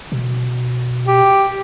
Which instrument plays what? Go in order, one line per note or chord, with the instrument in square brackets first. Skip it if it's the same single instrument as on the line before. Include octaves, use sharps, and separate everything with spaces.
[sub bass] B2
[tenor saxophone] G4